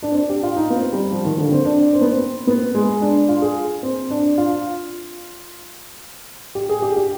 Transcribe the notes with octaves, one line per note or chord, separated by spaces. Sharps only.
D4
C4
D4
G4
F4
D#4
B3
C4
G3
F3
D#3
D3
C4
D4
C4
B3
C4
C4
B3
G#3
D4
F4
G#4
C4
D4
F4
G4
G#4
G4
G4